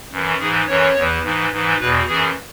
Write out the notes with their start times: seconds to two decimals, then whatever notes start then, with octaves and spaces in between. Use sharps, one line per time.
0.12 F#2 E3
0.39 G#2 E3 G#4
0.67 F#2 E3 C#5
0.96 E2 E3
1.23 G#2 E3
1.52 G#2 E3
1.79 E2 B2 B4
2.07 F#2 E3 G#4